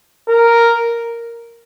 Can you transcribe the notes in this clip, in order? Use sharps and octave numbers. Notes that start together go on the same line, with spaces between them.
A#4